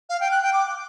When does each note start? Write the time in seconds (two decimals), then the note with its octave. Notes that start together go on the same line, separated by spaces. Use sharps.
0.09 F5
0.20 G5
0.31 F#6
0.42 G5
0.53 D6